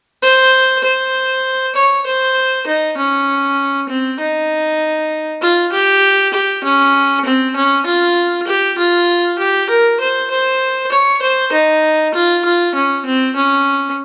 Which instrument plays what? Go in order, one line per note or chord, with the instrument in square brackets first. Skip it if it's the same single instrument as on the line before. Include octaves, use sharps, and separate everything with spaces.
[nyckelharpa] C5
C5
C#5
C5
D#4
C#4
C4
D#4
F4
G4
G4
C#4
C4
C#4
F4
G4
F4
G4
A#4
C5
C5
C#5
C5
D#4
F4
F4
C#4
C4
C#4